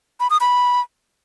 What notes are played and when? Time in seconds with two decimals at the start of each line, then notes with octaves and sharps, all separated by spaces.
0.20 B5
0.30 D#6
0.41 B5